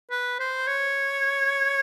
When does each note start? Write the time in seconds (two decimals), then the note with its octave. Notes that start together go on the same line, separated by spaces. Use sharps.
0.11 B4
0.40 C5
0.67 C#5